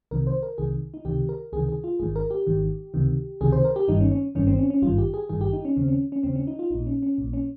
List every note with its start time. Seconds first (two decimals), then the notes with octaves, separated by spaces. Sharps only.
0.11 C2 C3 D#3 A#4
0.27 C5
0.43 A#4
0.58 C2 C3 D#3 G#4
0.94 D#4
1.05 C#2 C3 D#3 G4
1.29 A#4
1.53 C#2 C3 D#3 G#4
1.68 G#4
1.84 F4
1.99 G#1 G#2 D#3 G#4
2.16 A#4
2.30 G4
2.47 G#1 G#2 D#3
2.94 C#2 C3 D#3
3.41 C#2 C3 D#3 G#4
3.52 C5
3.65 A#4
3.76 G4
3.88 G1 G2 D#3 D#4
4.00 C#4
4.11 C#4
4.35 G1 G2 D#3 C#4
4.47 C4
4.59 C#4
4.70 C#4
4.82 G#1 G2 D#3 F4
4.98 G4
5.14 G#4
5.29 G#1 G2 D#3 G#4
5.41 G4
5.53 D#4
5.65 C#4
5.76 D#2 C#3 C4
5.88 C#4
6.12 C#4
6.23 D#2 C#3 C4
6.36 C#4
6.47 D#4
6.59 F4
6.70 A#1 A#2 D#4
6.87 C#4
7.02 C#4
7.18 A#1 A#2
7.33 C#4